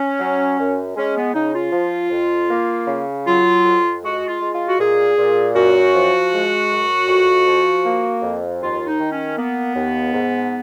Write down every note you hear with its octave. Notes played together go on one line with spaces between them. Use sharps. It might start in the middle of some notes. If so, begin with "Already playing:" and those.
Already playing: C#4
F#3
F#2
G#3 C#4
B3
C#3 D#4
F4
F3
F2
A#3
C#3
F#3 F4
F2
G#3 F#4
F4
G#3
F4
F#4
A#2 G#4
A#2
F#2 F#4
F3
G#3
F#2
F2
F3
A#3
F2
D#2 F4
D#4
D#3
C#4
A#3 B3
D#2
G#2